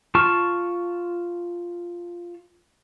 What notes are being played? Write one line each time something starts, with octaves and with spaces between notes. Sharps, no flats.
F4 A5 C#6 F6